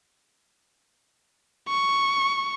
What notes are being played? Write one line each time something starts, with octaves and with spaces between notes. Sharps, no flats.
C#6